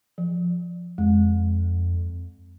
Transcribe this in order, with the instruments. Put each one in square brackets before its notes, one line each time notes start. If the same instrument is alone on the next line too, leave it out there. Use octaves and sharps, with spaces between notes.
[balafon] F3
[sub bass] F2 [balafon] G#3